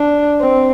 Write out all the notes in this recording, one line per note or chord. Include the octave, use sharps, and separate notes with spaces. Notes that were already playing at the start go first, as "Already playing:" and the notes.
Already playing: D4
C4